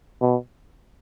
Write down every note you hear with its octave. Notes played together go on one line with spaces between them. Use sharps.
B2